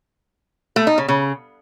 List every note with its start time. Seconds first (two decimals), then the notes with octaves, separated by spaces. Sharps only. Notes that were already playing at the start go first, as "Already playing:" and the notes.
0.76 A3
0.87 D#4
0.98 C#3
1.08 C#3